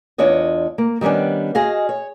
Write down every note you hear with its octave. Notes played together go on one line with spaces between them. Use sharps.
E2 D4 F4 C#5 D#5
A#3
D#3 G3 B3 C#4 D4
F#4 G#4 D#5 F5
C#5